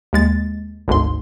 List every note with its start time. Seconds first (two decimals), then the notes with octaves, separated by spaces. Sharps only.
0.13 D#2 G#3 A6
0.88 G#1 D2 G#2 C6